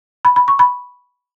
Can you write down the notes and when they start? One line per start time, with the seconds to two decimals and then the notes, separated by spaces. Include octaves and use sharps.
0.25 B5
0.36 B5
0.48 C#6
0.59 B5